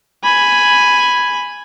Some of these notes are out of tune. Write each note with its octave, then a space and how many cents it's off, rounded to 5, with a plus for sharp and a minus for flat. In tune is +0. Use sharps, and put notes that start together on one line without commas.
G#5 +0 B5 +0